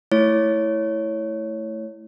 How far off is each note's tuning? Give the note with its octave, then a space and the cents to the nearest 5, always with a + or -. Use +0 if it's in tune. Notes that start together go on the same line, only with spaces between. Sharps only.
A3 +0 E4 +0 C#5 +0